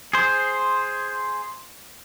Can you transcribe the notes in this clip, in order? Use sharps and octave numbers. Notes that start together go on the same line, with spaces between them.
G#4 C5